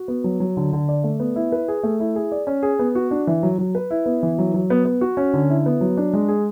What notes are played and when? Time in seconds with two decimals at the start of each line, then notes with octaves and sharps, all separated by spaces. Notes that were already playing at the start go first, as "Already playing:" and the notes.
Already playing: F#4
0.08 B3
0.24 F#3
0.40 F#3
0.57 D3
0.73 D3
0.89 D5
1.04 A3
1.20 B3
1.36 E4
1.52 B4
1.68 G#4
1.83 A3
2.00 E4
2.16 G#4
2.32 D5
2.47 C#4
2.63 G#4
2.79 B3
2.95 F#4
3.11 D4
3.27 E3
3.43 F#3
3.59 F#3
3.75 B4
3.91 E4
4.06 B3
4.23 E3
4.39 F#3
4.54 F#3
4.70 B3
4.85 B3
5.01 F#4
5.17 C#4
5.33 D3
5.50 E4
5.66 B3
5.81 F#3
5.97 D4
6.13 G#3
6.28 G#4